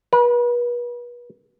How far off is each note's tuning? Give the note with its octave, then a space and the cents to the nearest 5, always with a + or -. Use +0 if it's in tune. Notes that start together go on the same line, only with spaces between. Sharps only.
B4 -35